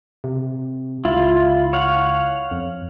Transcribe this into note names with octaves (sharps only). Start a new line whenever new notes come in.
C3
C#2 E4 F4
C#5 F5 F#5
F2